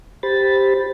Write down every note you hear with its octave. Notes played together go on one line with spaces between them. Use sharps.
G4 C5 B5 A6